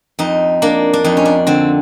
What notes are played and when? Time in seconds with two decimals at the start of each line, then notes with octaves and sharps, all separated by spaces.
0.19 F2 D#4
0.62 A#3 D4
0.93 D4
1.05 F2 D#4
1.17 C#4
1.25 D4
1.47 D3 C4